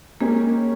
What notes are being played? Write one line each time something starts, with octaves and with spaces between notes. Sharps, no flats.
G#3 A#3 C#4 G4 A#4 C#5